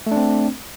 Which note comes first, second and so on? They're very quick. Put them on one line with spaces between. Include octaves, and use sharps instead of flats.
A3 D4 C4